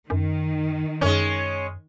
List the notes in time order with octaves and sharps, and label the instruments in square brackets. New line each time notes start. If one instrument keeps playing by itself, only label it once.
[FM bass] F#2 [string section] D#3
[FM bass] F#2 [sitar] G#3 C#4